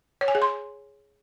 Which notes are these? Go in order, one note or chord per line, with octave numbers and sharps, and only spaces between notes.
C#5
G#5
G#4
C6